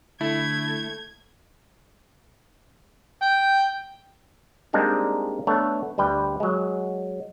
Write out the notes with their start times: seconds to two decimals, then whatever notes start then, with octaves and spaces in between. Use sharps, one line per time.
0.21 D3 A3 E4 G#6
3.22 G5
4.73 G3 G#3 A#3 C4 D4 D#4
5.47 A3 B3 D4 C#5
5.98 D2 G3 B4 G5
6.40 F#3 G#3